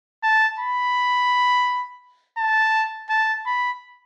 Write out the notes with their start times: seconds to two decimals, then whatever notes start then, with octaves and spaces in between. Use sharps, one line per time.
0.23 A5
0.59 B5
2.38 A5
3.09 A5
3.46 B5